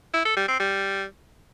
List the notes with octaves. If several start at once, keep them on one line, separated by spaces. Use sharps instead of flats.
E4
A4
G3
C4
G3